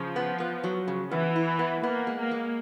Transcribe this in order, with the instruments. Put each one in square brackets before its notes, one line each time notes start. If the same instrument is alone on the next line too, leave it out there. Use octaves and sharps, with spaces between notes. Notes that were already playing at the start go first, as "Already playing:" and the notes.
Already playing: [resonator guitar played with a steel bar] C#3 [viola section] F3
[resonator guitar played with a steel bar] B3
B3
F#3
C#3
[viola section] E3 [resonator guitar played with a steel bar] B3
[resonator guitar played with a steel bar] E4
B3
[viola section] A#3 [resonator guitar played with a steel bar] B3
[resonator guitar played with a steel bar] G#3
[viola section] A#3
[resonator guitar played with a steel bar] G#3